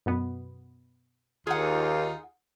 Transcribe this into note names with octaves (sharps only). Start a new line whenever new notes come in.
F#2 B2 B3
D#2 D#4 F4 G#4 F#5